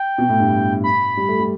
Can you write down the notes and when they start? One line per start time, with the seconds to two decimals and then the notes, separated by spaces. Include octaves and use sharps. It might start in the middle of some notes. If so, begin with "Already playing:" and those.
Already playing: G5
0.18 B2
0.29 A2
0.40 G2
0.84 B5
1.17 G3
1.28 A3
1.40 G3